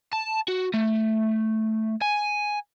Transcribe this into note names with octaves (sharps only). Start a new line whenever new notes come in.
A5
F#4
A3
G#5